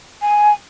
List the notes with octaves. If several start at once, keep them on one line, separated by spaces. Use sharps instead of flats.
G#5